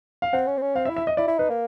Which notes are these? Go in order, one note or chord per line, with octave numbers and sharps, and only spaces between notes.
F5
C4 F#5
C#4
C4
C#4
C4 F5
E5
E4
E5
D#5
E4 D5
E4
D#4 B4
A#3